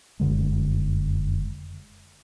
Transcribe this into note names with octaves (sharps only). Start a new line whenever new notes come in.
F1 F#2 D3 G#3